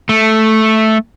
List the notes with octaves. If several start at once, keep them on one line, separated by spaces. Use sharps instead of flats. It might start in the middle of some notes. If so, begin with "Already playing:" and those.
A3